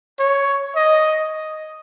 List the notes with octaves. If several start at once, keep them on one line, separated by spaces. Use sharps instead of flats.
C#5
D#5